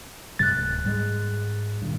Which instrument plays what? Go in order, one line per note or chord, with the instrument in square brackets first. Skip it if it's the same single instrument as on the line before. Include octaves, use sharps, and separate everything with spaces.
[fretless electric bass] F#2 C3 G3 [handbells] F#6 A6
[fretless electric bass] D1
G#2 G3 G#3
G2 A#2 D#3